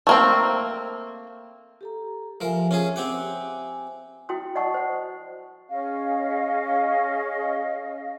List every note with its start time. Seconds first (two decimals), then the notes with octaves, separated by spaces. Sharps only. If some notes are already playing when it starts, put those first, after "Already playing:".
0.07 A3 A#3 C4
1.81 G4 A4 A#5
2.41 F3 A#4 E5 G#5
2.71 C#4 F4 G#4
2.96 C4 G4 F#5
4.29 E4 F#4 G5 C6 D#6
4.55 D5 D#5 F#5 A5 C#6 D#6
4.74 C5 F#5
5.69 C#4 G#4 D#5 F5